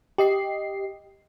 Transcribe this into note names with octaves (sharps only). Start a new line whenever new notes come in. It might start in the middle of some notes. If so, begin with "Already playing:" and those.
G4 D#5 C7